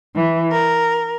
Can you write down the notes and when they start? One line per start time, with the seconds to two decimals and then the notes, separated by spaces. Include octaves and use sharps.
0.15 E3
0.52 A#4